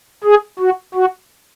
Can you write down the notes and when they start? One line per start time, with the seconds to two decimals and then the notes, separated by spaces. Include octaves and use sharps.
0.24 G#4
0.59 F#4
0.95 F#4